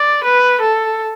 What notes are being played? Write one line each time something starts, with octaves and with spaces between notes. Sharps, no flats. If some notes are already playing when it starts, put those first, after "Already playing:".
Already playing: D5
B4
A4